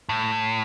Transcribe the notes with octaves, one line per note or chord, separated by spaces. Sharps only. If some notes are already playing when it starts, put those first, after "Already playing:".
A2